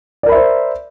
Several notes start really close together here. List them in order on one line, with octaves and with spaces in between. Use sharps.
D5 A#4 B5 E5 C5